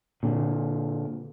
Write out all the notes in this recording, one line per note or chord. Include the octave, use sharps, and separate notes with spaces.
A#2 D3